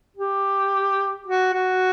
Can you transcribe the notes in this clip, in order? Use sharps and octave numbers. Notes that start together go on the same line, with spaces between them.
G4
F#4
F#4